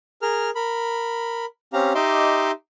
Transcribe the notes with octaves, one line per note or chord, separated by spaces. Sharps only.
G#4 A#4 F6
A#4 B5
C4 C#4 G4 F5 A#5
D#4 G4 D#5 E5 C6 D6